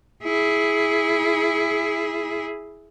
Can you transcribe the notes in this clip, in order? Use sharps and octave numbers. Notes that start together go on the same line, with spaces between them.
E4 G#4